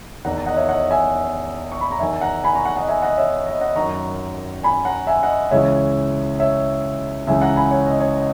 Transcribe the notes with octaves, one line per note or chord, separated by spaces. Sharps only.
E2 D#3 F#5 A#5
D#5 F#5
C#5 E5
D#5 F#5
E5 G#5
C#6
B5
A#5
E2 D#3 E5 G#5
F#5 A#5
G#5 B5
A#5 C#6
F#5 A#5
D#5 F#5
E5 G#5
D#5 F#5
C#5 E5
D#5
D#5
D#5 F#5
F#2 D#3 A#5 C#6
G#5 B5
F#5 A#5
E5 G#5
D#5 F#5
C#2 C#3 E3 C#5 E5
C#5 E5
C#2 C#3 E3 E5 G#5
F#5 A#5
G#5 B5
C#5
D#5
C#5
D#5